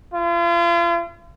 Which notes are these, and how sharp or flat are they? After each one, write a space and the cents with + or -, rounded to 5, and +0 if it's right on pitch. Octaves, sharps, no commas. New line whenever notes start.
F4 -40